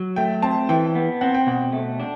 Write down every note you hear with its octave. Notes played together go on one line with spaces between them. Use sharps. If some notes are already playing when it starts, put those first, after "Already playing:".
Already playing: F#3
A3 G5
C4 A5
E3 G5
B3
C4 F#5
G5
B2 F#5
A3
D4